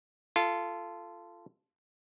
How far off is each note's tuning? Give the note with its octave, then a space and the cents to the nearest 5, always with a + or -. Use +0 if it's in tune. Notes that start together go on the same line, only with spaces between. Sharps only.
F4 -20 A4 +0